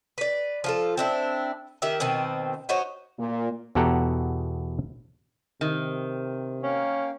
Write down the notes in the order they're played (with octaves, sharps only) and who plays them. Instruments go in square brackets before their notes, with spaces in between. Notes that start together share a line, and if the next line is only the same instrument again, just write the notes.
[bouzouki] B4 D5
F3 F4 A4
C4 D4 E4
D#3 G4 E5
B2 D#3 C4
D#4 F#4 C5 C#5
[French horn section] A#2
[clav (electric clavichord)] E2 B2 G4 A4 F#5 A#5
[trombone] C3 [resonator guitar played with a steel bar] D#3
[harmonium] A#3 F5 G5 [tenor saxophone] C#4